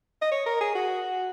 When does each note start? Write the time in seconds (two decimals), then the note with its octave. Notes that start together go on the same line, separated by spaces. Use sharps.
0.22 D#5
0.32 C#5
0.46 A#4
0.61 G#4
0.76 F#4